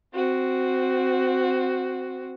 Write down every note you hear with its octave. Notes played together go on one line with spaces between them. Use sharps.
C4 F#4